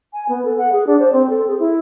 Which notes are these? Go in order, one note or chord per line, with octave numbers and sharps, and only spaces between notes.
G#5
B3
A4
F#5
G#4
D4
C5
C4
A4
G#4
E4